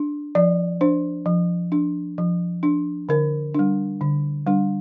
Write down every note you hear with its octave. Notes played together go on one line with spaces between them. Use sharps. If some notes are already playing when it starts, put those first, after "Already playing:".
Already playing: D4
F3 D5
D4 C5
F3
D4
F3
D4
D3 A#4
G3 D4
D3
G3 D4